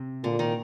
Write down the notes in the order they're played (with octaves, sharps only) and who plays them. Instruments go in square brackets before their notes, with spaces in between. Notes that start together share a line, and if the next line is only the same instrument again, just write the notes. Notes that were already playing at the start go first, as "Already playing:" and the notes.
Already playing: [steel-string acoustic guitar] C3
[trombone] A#2 [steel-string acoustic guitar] D3
[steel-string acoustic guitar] D#3